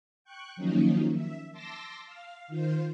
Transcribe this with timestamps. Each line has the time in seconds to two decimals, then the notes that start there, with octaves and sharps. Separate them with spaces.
0.24 G5 C#6 F#6
0.56 D#3 F3 F#3 A#3 C#4 D#4
1.12 E5
1.52 A5 C6 D6 E6 A#6
2.06 F5
2.48 D#3 F4 C5